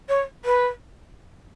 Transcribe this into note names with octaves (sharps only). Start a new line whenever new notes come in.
C#5
B4